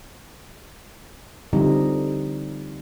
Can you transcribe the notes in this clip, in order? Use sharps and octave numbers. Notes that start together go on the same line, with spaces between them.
D3 F3 G3 C4 D#4